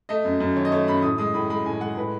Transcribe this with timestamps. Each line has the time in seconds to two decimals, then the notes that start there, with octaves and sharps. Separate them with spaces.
0.09 A3 D#5
0.25 F#2
0.40 F#2
0.56 D#3 C#5
0.65 D#5
0.72 A3 C#5
0.88 F#2 B5
1.02 A2 D#6
1.18 G#3 D#6
1.34 A2 B5
1.50 G#3 B5
1.66 A2 G#5
1.81 G#3 F#5
1.97 A2 B4